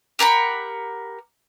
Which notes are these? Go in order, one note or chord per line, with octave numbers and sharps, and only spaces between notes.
G4 A#4 F#5 B5